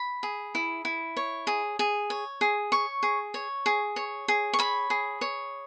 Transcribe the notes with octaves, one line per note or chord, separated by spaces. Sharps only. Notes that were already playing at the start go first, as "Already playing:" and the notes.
Already playing: B5
G#4
E4
E4
C#5
G#4
G#4
C#5
G#4
C#5 C#6
G#4
C#5
G#4
C#5
G#4
C#6
C#5 B5
G#4
C#5